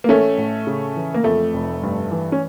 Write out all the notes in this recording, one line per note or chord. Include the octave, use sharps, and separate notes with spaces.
A#3
A1 A3 C#4
A2
C#3
E3
A#3
F2 A3
F1
G2
E3
C#4